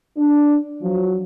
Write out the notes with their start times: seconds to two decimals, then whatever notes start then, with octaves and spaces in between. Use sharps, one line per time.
0.17 D4
0.82 F3 F#3